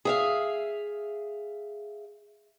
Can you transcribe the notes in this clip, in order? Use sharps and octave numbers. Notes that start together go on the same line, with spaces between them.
G#4 E5 F5